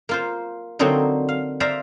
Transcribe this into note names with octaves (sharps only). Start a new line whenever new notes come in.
A#3 F4 C5
D3 F#3 A#3 C4 D4 D#4
F5
C5 D5 E5 F5 A#5